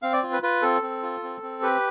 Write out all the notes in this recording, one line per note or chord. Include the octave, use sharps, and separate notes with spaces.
C4 F5
D5
F4
B4
F4 B4
C4 A4
C4
F4
C4
C4
G4 B4